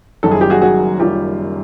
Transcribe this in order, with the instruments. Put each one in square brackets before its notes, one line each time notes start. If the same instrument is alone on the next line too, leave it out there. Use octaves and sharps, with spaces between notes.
[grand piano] F#1 F#2 D#3 G3 [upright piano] A4
[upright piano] G#4
G4
F#4 G#4
F#4 G#4
[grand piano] F#1 F#2 D#3 G3 [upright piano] F4 G4